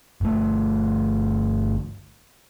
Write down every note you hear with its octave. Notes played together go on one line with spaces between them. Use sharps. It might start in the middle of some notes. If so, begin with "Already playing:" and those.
G1 A3